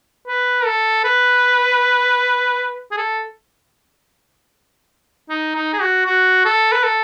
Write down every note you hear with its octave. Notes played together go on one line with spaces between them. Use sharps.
B4
A4
B4
G#4
A4
D#4
D#4
G#4
F#4
F#4
A4
B4
A4